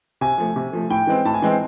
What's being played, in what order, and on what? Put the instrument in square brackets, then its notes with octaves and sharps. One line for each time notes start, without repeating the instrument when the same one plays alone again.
[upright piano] C3 [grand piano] G#5
[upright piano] F3 A3
C3
F3 A3
[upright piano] A2 [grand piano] G5
[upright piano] E3 G#3 C4
[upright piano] A2 [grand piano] A5
[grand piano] G#5
[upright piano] E3 G#3 C4 [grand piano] G5